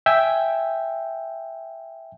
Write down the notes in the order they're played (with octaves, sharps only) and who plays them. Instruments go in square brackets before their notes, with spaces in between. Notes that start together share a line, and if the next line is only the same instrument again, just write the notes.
[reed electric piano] E5 G5 G#5